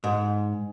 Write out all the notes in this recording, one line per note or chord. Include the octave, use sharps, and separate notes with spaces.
G#2